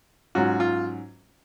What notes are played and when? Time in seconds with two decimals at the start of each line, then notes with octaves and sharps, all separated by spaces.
0.35 G#2 F#3 C#4 F4 F#4
0.60 F4